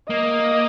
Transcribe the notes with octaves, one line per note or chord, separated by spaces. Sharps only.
A#3 D#5